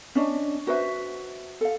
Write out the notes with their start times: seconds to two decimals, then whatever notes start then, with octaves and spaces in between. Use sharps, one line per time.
0.15 C#4 D4 D#5
0.67 F#4 B4 C5 E5
1.61 A4 F5